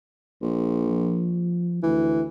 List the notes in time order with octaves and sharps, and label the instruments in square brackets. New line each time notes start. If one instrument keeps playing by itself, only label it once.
[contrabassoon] A#1
[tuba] F3
[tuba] D2 [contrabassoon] E3